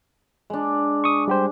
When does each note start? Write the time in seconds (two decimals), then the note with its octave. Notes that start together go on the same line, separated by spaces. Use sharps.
0.50 G#3 D4
1.04 C#6 D#6
1.28 G3 G4 C5